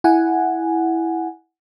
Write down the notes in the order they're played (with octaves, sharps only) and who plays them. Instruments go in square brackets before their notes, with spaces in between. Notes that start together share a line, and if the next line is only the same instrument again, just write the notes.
[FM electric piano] E4 F#5 G#5